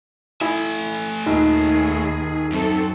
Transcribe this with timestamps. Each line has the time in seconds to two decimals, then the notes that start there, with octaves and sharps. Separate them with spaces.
0.41 A3 E4 A4 G#5
1.26 A#1 D#2 D#3 D#4 G#4
2.52 F#2 C4 A4